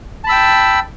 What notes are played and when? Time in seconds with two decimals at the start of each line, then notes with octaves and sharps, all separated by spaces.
0.24 A5
0.27 B5
0.29 E6
0.32 G5